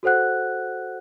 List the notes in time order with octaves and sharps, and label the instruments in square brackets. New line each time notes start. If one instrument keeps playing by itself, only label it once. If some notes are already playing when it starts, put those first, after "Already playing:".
[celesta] F#4 A4 C5 F#5 F#6